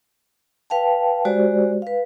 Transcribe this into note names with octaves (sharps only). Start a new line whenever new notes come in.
B4 F5 G5 A5
G#3 F#4 G4 C5 D5
B4 F5